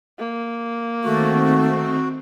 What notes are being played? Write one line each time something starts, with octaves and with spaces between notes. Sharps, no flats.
A#3
D#3 A3 C4 F#4